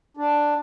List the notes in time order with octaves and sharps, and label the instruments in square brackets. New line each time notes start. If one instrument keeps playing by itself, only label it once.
[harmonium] D4